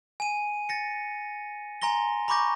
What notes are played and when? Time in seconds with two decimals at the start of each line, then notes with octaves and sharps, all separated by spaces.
0.20 G#5 D#7
0.69 A6 A#6 C#7
1.82 G#5 A#5 C6 A#6 G7
2.28 A#5 B5 C#6 D6 G6 A#6